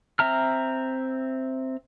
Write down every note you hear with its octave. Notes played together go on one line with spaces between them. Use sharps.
C4 E5 A#5 F6